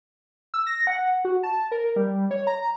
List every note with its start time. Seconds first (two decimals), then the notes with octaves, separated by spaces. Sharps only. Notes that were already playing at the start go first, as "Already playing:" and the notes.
0.54 E6
0.67 A#6
0.87 F#5
1.25 F#4
1.43 A5
1.72 A#4
1.96 G3
2.31 C#5
2.47 A#5